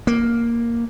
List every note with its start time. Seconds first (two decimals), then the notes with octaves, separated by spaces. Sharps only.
0.07 A#3